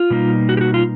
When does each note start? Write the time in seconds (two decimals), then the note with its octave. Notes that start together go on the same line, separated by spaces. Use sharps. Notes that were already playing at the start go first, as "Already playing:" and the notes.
Already playing: F4
0.10 B2 G3 A#3 D#4
0.49 F#4
0.57 G4
0.61 F#4
0.74 F4